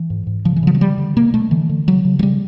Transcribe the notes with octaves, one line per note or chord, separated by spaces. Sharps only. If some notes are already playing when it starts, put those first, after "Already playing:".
Already playing: E3
G#2
G#2
C#3 F3
E3
C#3 F3
F#3
D3 G3
D3
B2 A#3
B2 A3
D3 E3
D3
C#3 F#3
C#3
F#3
C#3 G3